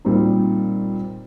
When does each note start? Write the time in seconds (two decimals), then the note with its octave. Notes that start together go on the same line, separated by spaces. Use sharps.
0.05 A#2 G3 C4 D#4